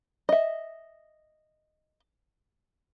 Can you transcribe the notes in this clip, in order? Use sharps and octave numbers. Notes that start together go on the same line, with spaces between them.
D#5 E5